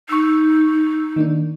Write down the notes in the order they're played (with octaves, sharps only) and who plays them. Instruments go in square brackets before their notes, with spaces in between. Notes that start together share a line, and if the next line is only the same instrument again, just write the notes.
[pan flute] D#4 [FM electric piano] C#6 E6
[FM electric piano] D#3 A#3 D4